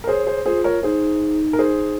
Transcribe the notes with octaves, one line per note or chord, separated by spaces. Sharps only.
A#4
G#4 C5 C#5
G#4 C5
F4 G#4 C5
A#4 C#5
D#4 G#4 C5
A#4
G#4 C5